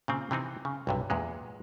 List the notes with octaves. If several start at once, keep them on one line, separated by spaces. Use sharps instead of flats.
A#2 C#3 C4
C3 E3 C4 D#4
C#3
B1 G2 C3
E2 A#2 G#3